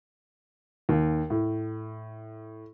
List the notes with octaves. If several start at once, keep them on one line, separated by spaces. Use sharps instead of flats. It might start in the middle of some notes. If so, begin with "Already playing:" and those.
D#2
A2